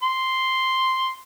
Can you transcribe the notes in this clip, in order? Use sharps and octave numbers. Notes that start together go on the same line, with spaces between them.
C6